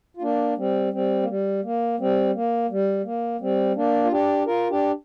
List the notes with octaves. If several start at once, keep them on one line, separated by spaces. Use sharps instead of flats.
F4
A#3 D4
G3 C4
G3 C4
A#3
G3
A#3
G3 C4
A#3
G3
A#3
G3 C4
A#3 D4
F4
D4 G4
F4 A#4
D4 G4